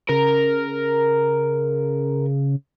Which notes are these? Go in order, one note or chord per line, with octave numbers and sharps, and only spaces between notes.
C#3 A#4